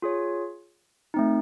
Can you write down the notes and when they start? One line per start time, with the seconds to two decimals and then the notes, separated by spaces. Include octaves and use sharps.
0.02 F4 G#4 C#5
1.14 A3 C4 D#4